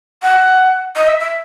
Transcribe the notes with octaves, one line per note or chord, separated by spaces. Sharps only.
F#5
D#5
E5
E5